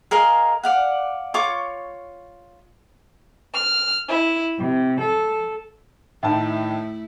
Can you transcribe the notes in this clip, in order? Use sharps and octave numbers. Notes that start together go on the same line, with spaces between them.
G#4 A#4 D#5 F5
D5 F5 F#5
F4 C#5 C#6 D6
F6
E4
C3
A4
A2 D#3 A3 E4 A5